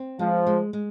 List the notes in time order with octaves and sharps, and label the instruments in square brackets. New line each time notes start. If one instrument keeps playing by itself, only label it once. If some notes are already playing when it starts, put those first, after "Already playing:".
Already playing: [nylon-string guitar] C4
[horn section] F3 [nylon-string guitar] G#3
[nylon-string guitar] G#3
G#3